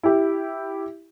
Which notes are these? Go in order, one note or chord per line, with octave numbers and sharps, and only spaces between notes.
E4 G4